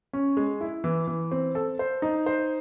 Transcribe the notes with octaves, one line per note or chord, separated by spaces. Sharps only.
C#4
G#3
E4
E3
E3
C4
A4
C5
D#4
C5